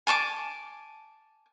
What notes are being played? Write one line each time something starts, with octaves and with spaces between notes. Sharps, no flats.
G#5 A5 C#6 D6